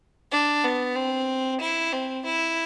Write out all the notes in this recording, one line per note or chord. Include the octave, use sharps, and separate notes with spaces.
D4
B3
C4
E4
C4
E4